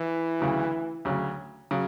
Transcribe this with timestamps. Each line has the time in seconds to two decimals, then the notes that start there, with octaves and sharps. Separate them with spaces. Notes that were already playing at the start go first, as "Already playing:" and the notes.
Already playing: E3
0.40 D2 C#3 F#3
1.05 D2 C#3 F#3
1.71 C#3 F#3